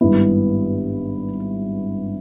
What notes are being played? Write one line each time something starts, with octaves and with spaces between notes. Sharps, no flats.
G#1 G2 G3 B3 E4